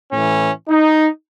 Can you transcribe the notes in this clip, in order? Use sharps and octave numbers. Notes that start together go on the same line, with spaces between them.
A2 E3 C#4
D#4